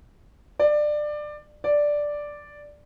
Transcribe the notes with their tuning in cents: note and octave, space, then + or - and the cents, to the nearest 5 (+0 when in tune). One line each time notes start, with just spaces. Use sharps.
D5 +20
D5 +0